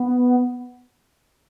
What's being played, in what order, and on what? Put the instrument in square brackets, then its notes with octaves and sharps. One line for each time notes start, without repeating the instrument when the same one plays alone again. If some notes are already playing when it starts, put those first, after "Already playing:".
Already playing: [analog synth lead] B3